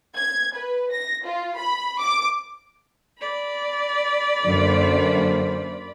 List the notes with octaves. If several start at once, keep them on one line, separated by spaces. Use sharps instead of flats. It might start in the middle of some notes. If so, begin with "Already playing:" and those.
G#6
B4
A#6
F4
B5
D6
D5 B5
F#2 D3 A#3 C5